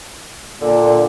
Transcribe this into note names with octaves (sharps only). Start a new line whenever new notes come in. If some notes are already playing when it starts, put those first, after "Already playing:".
A#2 D3